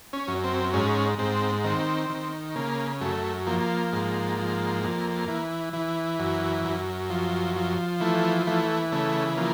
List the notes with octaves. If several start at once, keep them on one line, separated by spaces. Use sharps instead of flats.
C#4
F#2
C4
G#2 C#4
G#2 C4
D#3 C4
D#3
C#3 A#3
F#2 A3
F3 A#3
G#2
F3
F2
E3
E3
F#2
F#2
F3
F3
E3 A3
E3 A3
C#3 A3
F3 A#3